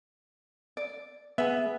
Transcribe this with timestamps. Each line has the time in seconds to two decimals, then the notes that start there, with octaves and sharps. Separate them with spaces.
0.77 D5
1.38 B3 G#4 E5